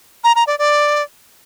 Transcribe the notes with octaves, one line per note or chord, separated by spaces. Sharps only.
A#5
A#5
D5
D5